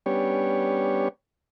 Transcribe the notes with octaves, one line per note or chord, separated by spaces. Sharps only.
G3 B3 C#4 D4 G4 C#5